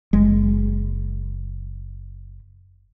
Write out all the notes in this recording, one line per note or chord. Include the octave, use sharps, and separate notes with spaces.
F#1 G#3